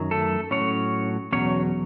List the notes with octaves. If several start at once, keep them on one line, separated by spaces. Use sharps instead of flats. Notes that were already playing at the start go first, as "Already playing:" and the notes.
Already playing: F#2 D#3 F#3
A3 A4
A2 F#3 C#4 C#5
E2 B2 F#3 C#4 C#5